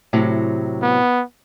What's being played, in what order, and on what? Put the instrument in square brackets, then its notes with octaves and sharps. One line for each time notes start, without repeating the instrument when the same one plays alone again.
[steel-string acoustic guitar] A2 C3 F#3
[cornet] B3